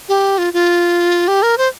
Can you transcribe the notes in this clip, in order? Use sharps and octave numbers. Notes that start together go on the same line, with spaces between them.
G4
F4
F4
G4
A#4
C5